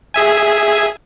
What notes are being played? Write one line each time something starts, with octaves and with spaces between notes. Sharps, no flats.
G#4 E5 G#5